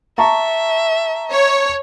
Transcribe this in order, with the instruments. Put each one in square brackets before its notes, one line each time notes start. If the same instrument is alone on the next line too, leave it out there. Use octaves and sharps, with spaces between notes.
[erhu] E5 [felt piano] A5 A#5 C#6
[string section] C#5